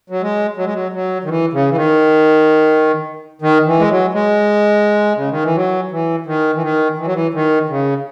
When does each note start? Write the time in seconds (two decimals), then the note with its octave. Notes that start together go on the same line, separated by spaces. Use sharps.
0.10 F#3
0.22 G#3
0.57 F#3
0.66 G#3
0.74 F#3
0.93 F#3
1.24 D#3
1.29 E3
1.53 C#3
1.69 E3
1.76 D#3
3.42 D#3
3.66 E3
3.79 G#3
3.90 F#3
4.14 G#3
5.17 C#3
5.31 D#3
5.44 E3
5.56 F#3
5.91 E3
6.26 D#3
6.55 E3
6.63 D#3
6.98 E3
7.06 F#3
7.14 E3
7.34 D#3
7.69 C#3